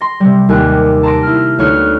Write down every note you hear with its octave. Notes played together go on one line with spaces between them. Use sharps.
C6 A#6
C3 G3
D#2 G4 A#4 G#5 F#6
A5 A#5 C6 A#6 D7
E4 F6
D2 B3 D#4 C#5 F6 F#6